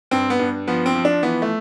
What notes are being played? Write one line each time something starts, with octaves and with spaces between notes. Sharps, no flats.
G2 C4
B3
G2
F3 B3
C4
F3
D4
E3 B3
A3